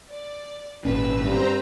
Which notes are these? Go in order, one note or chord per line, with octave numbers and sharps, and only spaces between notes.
D5
G#1 A#2 C#4 B4 E6
G2 C4 C5 A#5